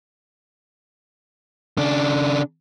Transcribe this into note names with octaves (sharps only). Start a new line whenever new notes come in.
C#3 D4